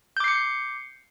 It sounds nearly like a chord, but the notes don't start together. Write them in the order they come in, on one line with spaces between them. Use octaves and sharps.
G6 D6 C7 C#7